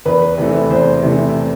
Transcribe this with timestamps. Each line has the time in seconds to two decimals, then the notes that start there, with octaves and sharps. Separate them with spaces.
0.05 E2 B4
0.38 C3 E3 A3
0.70 E2 C5
1.03 C3 E3 A3